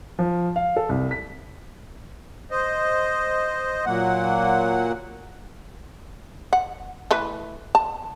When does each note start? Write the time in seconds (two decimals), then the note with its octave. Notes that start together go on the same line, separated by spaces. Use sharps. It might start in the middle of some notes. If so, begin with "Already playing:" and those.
0.19 F3
0.56 F5
0.76 A4
0.89 C2
1.11 B6
2.51 C5 D#5
3.86 A#2 F#3 A#3 F#5
6.53 F#5
7.11 E3 A3 B4
7.75 A5